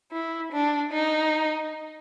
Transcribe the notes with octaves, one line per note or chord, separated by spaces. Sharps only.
E4
D4
D#4